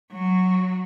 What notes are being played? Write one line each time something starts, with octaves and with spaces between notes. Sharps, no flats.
F#3